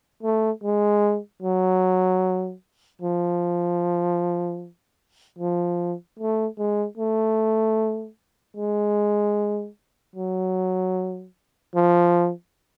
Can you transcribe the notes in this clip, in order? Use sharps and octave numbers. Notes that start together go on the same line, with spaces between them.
A3
G#3
F#3
F3
F3
A3
G#3
A3
G#3
F#3
F3